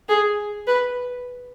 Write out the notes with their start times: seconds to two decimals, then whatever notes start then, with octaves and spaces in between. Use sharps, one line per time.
0.09 G#4
0.67 B4